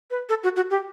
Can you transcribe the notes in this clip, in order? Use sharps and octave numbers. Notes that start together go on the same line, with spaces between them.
B4
A4
F#4
F#4
G4